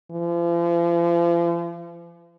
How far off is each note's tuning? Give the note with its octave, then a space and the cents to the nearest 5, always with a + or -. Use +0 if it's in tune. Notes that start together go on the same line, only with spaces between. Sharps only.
F3 -40